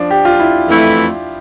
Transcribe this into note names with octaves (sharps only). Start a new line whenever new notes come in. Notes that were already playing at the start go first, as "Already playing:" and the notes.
Already playing: F3 D4
G4
F4
E4
F2 E3 A3 E4